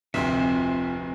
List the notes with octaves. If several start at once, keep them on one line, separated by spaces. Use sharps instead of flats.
F1 D2 C4 F4 E5 C6